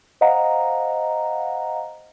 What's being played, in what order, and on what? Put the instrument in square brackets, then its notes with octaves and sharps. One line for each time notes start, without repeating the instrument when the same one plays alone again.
[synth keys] C5 D#5 F5 F#5 A#5